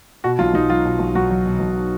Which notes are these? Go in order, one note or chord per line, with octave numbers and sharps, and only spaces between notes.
B2 F#4
B1 F4
B1 D#4
F#3 F4
B2
B1
B1 F#4
F#3
B2
B1